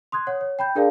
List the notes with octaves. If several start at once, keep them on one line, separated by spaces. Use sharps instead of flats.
C6 D#6 F#6 G#6
C#5 F#5
C#5
G5 B5 G6
D4 G#4 A#4 D5 F5 A5